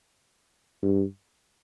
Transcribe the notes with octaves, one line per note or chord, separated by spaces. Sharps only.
G2